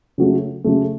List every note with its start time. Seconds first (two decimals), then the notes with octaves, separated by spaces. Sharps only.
0.18 C#3 F#3 A3
0.64 C#3 F#3 A3